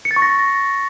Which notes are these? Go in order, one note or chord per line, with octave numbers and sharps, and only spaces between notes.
C#7
A6
C#6
A#6